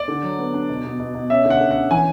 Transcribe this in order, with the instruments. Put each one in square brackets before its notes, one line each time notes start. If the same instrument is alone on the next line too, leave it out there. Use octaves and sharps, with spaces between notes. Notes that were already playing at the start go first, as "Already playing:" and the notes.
Already playing: [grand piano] D5
D3
F#3
B3
D4
B2
B2
B2
B2
C#4 E5
D3
F#5
D3
C#4 F#5
E3 G#5